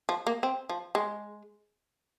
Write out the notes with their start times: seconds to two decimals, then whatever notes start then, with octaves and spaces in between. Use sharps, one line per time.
0.09 F3
0.27 A#3
0.43 C4
0.69 F3
0.95 G#3